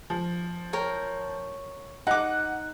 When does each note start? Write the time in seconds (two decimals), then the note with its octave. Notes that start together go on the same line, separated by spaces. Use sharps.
0.10 F3
0.73 A#4 C#5 G5
2.07 D#4 F#5 D6 F#6